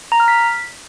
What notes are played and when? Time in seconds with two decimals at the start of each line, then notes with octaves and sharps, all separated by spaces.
0.12 A#5
0.20 F6
0.28 B6